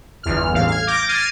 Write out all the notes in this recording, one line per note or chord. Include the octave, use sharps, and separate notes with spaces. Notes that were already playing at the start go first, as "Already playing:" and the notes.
G1 E2 F6
A1 F5
F6 G#6
D6 G6 A#6 D7
F6 G#6 A6 C7 D#7